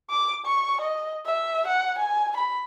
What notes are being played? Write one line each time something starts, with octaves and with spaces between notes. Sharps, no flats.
D6
C#6
D#5
E5
F#5
G#5
B5